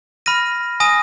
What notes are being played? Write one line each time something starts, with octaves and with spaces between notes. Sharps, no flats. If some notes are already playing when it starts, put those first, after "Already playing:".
B5 F6 A#6 D#7
G#5 D#6 A#6 D#7